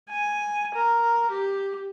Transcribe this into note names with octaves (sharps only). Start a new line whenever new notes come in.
G#5
A#4
G4